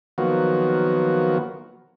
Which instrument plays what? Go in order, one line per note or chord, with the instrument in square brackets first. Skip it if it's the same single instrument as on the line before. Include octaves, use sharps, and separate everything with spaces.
[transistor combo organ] D#3 F3 F#3 A#3 B3 F#4